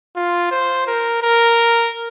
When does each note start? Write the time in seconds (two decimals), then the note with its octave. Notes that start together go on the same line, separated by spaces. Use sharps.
0.16 F4
0.51 C5
0.87 A#4
1.22 A#4